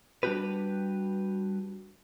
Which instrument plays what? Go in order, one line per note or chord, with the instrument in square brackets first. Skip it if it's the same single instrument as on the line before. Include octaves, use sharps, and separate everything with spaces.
[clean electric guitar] G3 D4 D#4 F#4 G4 B4